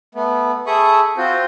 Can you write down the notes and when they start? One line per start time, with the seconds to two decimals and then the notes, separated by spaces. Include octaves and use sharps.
0.15 A3 B3
0.67 G#4 A4 E5 B5 C#6 D#6
1.17 C4 F4 F#4 C5